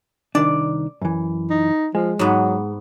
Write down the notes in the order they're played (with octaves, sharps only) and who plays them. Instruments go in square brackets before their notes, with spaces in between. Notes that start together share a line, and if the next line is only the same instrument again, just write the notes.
[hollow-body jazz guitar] C2 D#3 D4 [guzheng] D5
[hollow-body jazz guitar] F#2 E3
[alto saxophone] D#4
[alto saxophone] F3 [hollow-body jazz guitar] G#3
[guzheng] G#2 B3 [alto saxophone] F#3